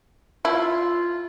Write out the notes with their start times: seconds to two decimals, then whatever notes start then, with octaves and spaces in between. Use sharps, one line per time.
0.45 E4 F4